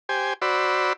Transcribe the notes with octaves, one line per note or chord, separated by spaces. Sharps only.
G4 C5 G#5
F#4 C5 D5 B5 E6